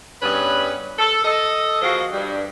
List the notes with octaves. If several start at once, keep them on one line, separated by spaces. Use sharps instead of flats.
G2 C#3 B3 C#4 B4
A4
A4 D#5
F3 A#3 F#4 G#4 A4 D#5
G2